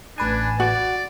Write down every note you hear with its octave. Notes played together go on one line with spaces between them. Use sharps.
A1 D4 B4 G#5
F#4 D5